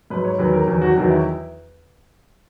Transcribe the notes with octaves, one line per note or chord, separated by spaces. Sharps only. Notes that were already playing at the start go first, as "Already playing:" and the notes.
G#2 F#3 B4
C#5
E2 D#3 F#3 B4
A#4
E2 D#3 F#3
F#4
E2 D#3 F#3 F#4
E4